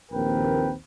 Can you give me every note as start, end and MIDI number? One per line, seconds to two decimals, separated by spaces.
0.12 0.73 34
0.12 0.73 39
0.12 0.73 60
0.12 0.73 70
0.12 0.73 71
0.12 0.73 79